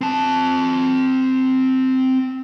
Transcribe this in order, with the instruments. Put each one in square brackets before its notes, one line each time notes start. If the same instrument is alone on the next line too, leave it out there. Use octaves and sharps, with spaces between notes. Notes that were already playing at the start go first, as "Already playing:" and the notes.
[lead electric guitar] C4 A5